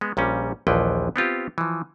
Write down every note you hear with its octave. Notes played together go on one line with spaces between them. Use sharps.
G#3 B3
A#1 A#2 G3 C#4
A#1 D#2 E3 F3 B4 G5
B3 C4 F4 G4
E3 F3